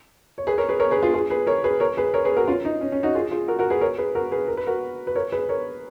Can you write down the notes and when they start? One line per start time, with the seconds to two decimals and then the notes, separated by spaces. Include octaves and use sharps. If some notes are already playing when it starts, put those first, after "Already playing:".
0.38 C#5
0.47 G#4 B4
0.58 A#4 C#5
0.69 G#4 B4
0.80 A#4 C#5
0.91 G#4 B4
1.03 F4 G#4
1.14 F4 G#4
1.30 G#4 B4
1.47 A#4 C#5
1.64 G#4 B4
1.80 A#4 C#5
1.97 G#4 B4
2.14 A#4 C#5
2.25 G#4 B4
2.37 F#4 A#4
2.47 C#4 F4
2.65 D#4
2.81 C#4
2.92 C#4
3.03 D#4 F#4
3.15 F4 G#4
3.31 F4 G#4
3.48 F#4 A#4
3.59 F#4 A#4
3.70 G#4 B4
3.81 A#4 C#5
3.98 G#4 B4
4.15 F#4 A#4
4.32 G#4 B4
4.48 A#4
4.57 B4
4.67 F#4 A#4
5.07 B4
5.15 A#4 C#5
5.32 G#4 B4
5.49 A#4 C#5